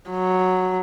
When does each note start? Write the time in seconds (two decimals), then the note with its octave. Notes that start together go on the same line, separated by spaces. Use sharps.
0.10 F#3